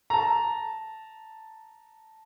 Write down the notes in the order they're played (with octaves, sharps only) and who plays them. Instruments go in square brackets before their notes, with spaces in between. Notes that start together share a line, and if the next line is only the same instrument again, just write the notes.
[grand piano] A5 A#5